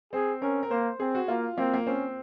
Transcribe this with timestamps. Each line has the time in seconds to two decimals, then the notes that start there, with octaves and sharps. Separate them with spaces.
0.13 C4 G#4
0.42 C#4 A#4
0.63 A#4
0.71 A#3 C5
1.00 C4 G#4
1.15 F#4
1.28 A#3 F4
1.58 A#3 C4
1.74 A#3
1.87 C4 C#4